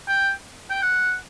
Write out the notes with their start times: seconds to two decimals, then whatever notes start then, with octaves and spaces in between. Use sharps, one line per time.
0.08 G5
0.70 G5
0.82 F#5